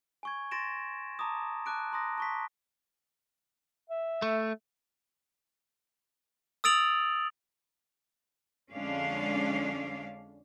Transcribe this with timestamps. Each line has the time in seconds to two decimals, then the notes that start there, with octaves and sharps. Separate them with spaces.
0.23 G#5 C#6 G#6
0.51 C6 A6 A#6 D7 E7
1.19 A5 A#5 D6 D#6
1.66 A5 D6 F#6 D7
1.92 A#5 C6 D#6 A#6
2.18 A5 C#6 B6
3.90 E5
4.22 A3
6.64 D#6 E6 A6 D7 F7 F#7
8.74 F2 D3 G#3 C#4 D4 F5